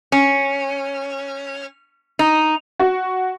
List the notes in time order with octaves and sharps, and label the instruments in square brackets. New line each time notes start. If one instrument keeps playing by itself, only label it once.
[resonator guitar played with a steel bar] C#4
D#4
[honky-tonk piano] F#4